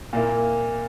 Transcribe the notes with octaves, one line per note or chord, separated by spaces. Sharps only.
A#2 A#3 E4